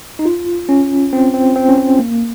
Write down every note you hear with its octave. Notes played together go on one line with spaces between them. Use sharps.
D#4
F4
C#4
C4
C4
C4
C#4
C4
A#3